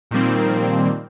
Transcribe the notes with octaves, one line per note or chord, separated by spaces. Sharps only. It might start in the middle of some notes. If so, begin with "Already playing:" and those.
A#2 D#3 F3 G3 A#3 C4